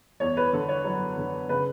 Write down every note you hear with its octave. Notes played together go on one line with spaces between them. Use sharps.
E2 C#5
B4
D3 A4
C#5
F#3
D3
C#3 B4